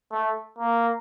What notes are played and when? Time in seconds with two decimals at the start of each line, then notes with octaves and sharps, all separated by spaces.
0.12 A3
0.59 A#3